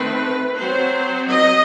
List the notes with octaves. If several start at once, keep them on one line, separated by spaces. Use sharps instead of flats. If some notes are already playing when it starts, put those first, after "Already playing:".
Already playing: D#3 A3 C4 B4
F#3 C4 C5
D#5